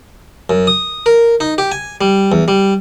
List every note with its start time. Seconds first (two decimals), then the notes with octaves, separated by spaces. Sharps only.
0.50 F#2
0.67 D#6
1.06 A#4
1.40 D#4
1.58 G4
1.72 G#5
2.01 G3
2.32 E2
2.48 G3